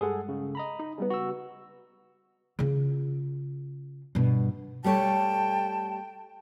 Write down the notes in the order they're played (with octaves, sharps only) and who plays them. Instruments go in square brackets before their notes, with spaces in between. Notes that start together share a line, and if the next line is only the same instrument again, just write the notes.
[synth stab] G2 G#3 [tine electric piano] G#4 A4 F#5
[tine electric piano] C#3
D#5 A#5 B5
[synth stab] D#4
C#3 G3 B3
[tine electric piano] F#4 E6
[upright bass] C#3 F4
G2 B2
[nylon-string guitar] G3 A3 C#5 [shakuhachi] G5 [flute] A5